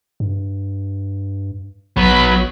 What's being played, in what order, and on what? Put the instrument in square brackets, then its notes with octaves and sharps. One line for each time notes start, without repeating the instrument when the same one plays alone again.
[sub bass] G2
[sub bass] A#1 [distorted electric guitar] F#3 B3 [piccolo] B5